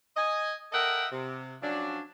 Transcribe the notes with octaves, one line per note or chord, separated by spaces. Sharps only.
D#5 G#5
A4 A#4 D#5 E5 F#5 G5
C3
F3 F#3 C#4 D4